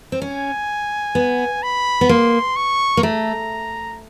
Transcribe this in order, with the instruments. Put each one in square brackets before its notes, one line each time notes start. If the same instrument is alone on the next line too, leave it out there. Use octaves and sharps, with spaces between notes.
[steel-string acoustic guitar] C4
[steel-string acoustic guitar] C#4 [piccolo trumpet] G#5
[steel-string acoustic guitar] B3
[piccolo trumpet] B5
[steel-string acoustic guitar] B3
[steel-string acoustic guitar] A#3 [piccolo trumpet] C6
[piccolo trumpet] C#6
[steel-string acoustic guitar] A#3
[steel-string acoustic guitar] A3 [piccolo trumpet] A#5